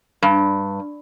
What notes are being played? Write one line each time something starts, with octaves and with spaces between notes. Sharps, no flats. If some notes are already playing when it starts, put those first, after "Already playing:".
G2